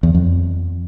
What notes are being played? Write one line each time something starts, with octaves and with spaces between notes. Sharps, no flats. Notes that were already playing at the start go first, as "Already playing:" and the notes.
E2
F2